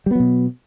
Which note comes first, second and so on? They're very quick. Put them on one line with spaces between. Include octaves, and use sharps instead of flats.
G3 B3 F#3 B2